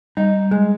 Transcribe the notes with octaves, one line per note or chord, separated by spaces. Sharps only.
G3 D#4
G#3